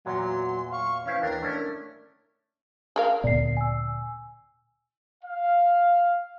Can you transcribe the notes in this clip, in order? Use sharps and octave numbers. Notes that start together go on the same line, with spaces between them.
E2 A#2 F#3 C6
F5 C#6
E3 C#4 E4 C5 F5
D#2 D4 A#4 A#5
A3 C#4 D4 E4
G#4 A#4 F5
D2 A#2 B3 D5 C7
G#5 E6
F5